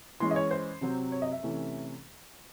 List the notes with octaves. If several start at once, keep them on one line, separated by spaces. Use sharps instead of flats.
E3 G#3 C#4 C6
D#5
C#5
C5
C3 F#3 C4
C#5
D#5
E5
C3 E3 A3 C#4